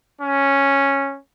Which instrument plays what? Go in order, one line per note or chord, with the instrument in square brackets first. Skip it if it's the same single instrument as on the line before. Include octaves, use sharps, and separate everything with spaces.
[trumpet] C#4